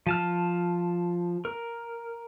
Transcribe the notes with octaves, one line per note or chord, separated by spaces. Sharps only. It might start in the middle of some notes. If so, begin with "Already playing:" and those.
F3 A5 F6
A#4